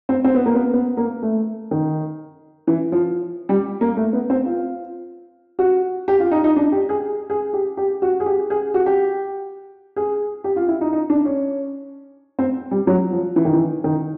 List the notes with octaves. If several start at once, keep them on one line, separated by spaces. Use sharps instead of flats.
C4
C4
B3
A#3
B3
B3
A#3
A3
D#3
E3
F3
G3
A#3
A3
B3
C4
F4
F#4
G4
F4
D#4
D#4
D4
G4
G#4
G#4
G4
G4
F#4
G#4
G4
G#4
F#4
G4
G#4
G4
F4
E4
D#4
D#4
D4
C#4
C4
G3
F#3
F3
E3
D#3
E3
D#3